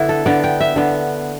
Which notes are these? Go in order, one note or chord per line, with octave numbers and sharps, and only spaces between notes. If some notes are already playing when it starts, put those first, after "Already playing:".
Already playing: D3 B3 D4 E4
A4
D3 B3 D5
G5
E5
D3 B3